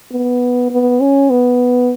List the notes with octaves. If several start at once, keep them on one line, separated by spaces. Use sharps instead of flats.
B3
B3
C#4
B3